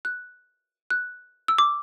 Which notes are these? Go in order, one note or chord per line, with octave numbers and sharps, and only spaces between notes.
F#6
F#6
E6
D6